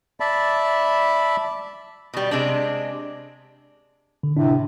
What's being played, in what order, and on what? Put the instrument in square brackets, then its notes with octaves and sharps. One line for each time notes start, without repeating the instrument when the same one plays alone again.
[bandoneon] D5 E5 A5 B5
[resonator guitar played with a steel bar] B2 G3
C3 G#3 D4
[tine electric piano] D3
[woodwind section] A2 C3 [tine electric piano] D4